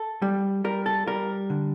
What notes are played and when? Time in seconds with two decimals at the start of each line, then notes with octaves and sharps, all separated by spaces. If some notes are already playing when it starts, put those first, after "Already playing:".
Already playing: A4
0.22 G3
0.64 G3 A#4
0.86 A4
1.08 G3 A#4
1.50 D3